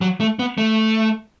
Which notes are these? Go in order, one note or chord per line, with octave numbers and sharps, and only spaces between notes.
F#3
A3
B3
A3